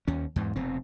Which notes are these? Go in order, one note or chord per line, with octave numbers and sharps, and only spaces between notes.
D#2 C#4
E2 G#2
F1 B2 C4